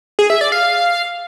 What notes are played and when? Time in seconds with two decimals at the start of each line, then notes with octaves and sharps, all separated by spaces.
0.19 G#4
0.30 E5
0.41 D5
0.52 F5